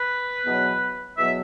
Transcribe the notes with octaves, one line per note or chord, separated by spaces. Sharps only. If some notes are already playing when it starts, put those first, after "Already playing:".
Already playing: B4
E2 B2 F#3 B3
E2 B2 F#3 B3 E5